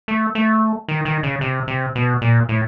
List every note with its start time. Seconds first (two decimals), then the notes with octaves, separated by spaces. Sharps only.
0.08 A3
0.35 A3
0.88 D#3
1.05 D#3
1.23 C#3
1.41 C3
1.68 C3
1.95 B2
2.22 A#2
2.49 A2